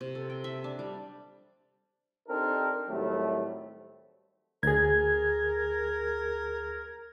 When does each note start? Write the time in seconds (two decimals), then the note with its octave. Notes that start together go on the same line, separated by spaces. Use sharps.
0.01 C3
0.15 A4
0.30 G5
0.44 E5
0.64 D4
0.79 G3
2.29 C4 D4 D#4 G4 A4 A#4
2.89 D#2 A2 F#3 G3 A3 C4
4.63 D2 G#4 A#4 G#6